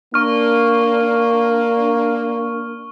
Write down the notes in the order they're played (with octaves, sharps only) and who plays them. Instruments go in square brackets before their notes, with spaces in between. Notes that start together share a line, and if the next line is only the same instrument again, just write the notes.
[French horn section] A#3 D4 [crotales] C#6 F6